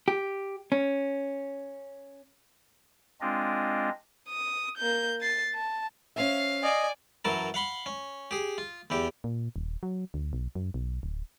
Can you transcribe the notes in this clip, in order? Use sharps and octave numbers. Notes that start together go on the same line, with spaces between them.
G4
C#4
G#3 C4 D4 F4 D#5
D#6
A#3 G6
A6 C7
A5
C#4 C5 E5 F5
D5 D#5 G#5
F#2 E3 F#3 A#4 A5
F5 F#5 B5 C6
C#4
G4 G#4
F4
E2 E3 G4
A#2
D#1
F#3
D2
B1
F#2
B1
D1